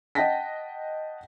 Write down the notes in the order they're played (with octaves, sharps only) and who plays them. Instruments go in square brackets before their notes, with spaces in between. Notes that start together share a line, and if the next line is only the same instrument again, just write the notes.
[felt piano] D#5 F#5 G5 A5 A#6 B6